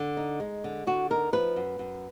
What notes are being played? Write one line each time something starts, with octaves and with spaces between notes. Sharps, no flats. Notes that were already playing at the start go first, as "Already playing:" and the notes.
Already playing: D3
D#4
G#3
D3
D3 F#4
D#4 A#4
F3 B4
F#2
F#2